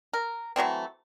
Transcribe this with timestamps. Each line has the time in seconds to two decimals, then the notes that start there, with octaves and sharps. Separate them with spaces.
0.13 A#4
0.56 E3 F#3 A3 C4